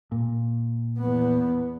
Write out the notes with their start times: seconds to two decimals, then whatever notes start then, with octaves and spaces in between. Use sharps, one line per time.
0.12 A#2
0.99 E2 B3